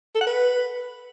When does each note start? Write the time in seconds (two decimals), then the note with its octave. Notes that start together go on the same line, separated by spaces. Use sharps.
0.15 A4
0.21 F#5
0.26 B4